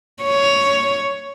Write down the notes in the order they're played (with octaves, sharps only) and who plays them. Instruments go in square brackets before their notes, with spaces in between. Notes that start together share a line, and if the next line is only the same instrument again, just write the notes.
[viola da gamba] C#5